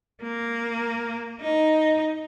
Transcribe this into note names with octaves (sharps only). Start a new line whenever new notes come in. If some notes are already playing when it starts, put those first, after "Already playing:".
A#3
D#4